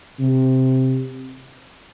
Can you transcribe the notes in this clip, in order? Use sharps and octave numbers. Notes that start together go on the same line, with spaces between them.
C3